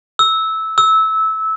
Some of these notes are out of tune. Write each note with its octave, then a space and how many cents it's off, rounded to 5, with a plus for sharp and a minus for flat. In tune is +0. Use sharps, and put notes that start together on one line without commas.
E6 -15
E6 -20